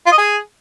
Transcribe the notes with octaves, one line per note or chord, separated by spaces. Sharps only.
F4
D#5
G#4